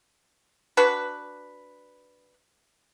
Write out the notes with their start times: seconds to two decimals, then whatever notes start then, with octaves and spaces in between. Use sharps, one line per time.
0.77 D4 F#4 B4